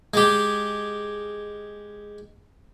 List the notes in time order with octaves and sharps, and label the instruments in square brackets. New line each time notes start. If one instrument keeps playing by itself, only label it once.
[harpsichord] G#3 G4